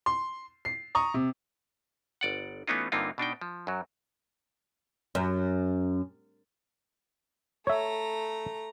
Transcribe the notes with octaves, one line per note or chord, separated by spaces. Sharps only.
C6
C7
A#5 C#6 D#6
C3
G1 D5 F#5
E3 A3 B3 C#4 D#4 F4
G2 D3 A#3 C4 D#4 F4
B2 D4 D#4 G5
F3
F#2 F#3
F#2
A3 C#5 E5 A#5